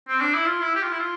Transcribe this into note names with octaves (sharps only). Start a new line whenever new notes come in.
C4
D4
E4
F4
E4
G4
F4
E4
F4